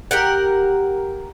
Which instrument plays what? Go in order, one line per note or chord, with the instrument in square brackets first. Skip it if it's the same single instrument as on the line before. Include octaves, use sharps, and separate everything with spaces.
[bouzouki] G4 A#4 F#5